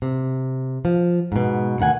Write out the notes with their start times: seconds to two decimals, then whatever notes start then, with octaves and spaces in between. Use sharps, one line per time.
0.02 C3
0.85 F3
1.32 G#2 B2
1.80 D2 D#3 F#5 G#5